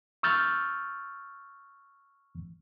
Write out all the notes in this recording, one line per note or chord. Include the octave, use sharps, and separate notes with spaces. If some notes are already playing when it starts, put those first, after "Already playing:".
C#6 E6 F6 G6 A6